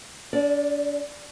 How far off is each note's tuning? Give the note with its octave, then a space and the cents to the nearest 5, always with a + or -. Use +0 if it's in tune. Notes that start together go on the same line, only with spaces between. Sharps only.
D4 -40 D5 +0